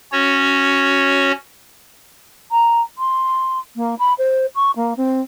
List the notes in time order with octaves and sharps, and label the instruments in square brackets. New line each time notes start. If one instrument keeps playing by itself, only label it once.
[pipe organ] C#4 F#4 C#5
[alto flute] A#5
C6
A#3
B5
C5
C#6
A#3
C4